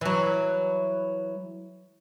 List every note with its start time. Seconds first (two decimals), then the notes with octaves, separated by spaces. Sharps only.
0.01 E3 F#3